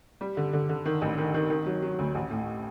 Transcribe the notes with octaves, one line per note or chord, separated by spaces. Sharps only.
G3
D3
D3
D3
D#3
A1
D#3
D#3
D#3
F#3
F#3
D2
A1
A2